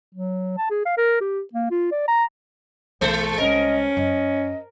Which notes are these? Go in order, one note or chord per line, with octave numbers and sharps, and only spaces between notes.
F#3
A5
G#4
F5
A#4
G4
A#3
F4
D5
A#5
B1 E3 G#3 C5
C2 G#3 C#4 A#4 D#5
F#2 D#5